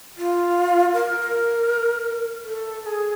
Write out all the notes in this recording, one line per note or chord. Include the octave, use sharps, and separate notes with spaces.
F4
A#4
A4
A4
G#4